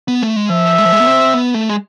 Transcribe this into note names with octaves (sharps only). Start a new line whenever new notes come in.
B3
A3
G#3
F3 E5
G#3
F3
G#3
B3
C4
B3
A3
G#3